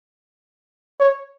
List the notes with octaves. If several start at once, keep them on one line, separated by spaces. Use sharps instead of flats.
C#5